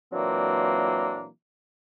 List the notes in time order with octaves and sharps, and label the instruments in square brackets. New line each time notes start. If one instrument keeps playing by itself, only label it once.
[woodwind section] A#2 E3 F#3 A#3 C4 D4